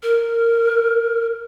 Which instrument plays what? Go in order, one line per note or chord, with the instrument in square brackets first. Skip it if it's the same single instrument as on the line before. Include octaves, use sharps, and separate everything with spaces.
[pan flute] A#4